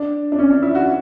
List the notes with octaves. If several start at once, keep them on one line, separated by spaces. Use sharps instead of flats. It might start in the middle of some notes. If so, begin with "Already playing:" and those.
Already playing: D4
D4
C#4
D4
E4
F#4